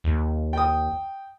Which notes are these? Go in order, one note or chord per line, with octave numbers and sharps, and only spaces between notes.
D#2
G5 D#6